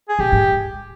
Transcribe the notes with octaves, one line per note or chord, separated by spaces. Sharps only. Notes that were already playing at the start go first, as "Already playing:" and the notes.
G#4
B2 G4
G#2